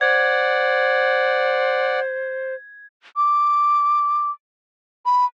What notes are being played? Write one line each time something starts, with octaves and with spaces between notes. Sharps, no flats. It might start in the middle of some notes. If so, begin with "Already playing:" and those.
C5 D5 F#5 G#6
D6
B5